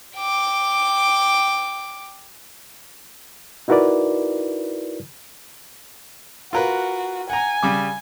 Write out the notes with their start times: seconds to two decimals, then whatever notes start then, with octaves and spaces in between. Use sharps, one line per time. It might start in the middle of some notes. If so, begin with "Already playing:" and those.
0.17 G5 D6
3.68 D#4 E4 F#4 A#4 B4 D5
6.53 F4 F#4 A#4 B4
7.30 F#5 G#5 A#5
7.63 C#3 G3 D6